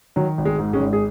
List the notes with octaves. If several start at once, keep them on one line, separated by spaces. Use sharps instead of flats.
D#3 F#3
G#1
G#3
G#2
G#3 C#4
G#1
G#4